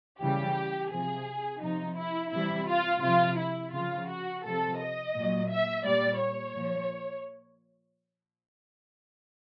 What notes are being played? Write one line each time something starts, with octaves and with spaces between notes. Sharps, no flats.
C#3 E3 G3 G4
C3 F3 G#4
C3 F3 D#4
E4
C3 E3 G3 E4
F4
C3 F3 F4
E4
C#3 F3 F4
F#4
C3 F3 A4
D#5
A#2 F#3
E5
A#2 G3 D5
C#5
A#2 F3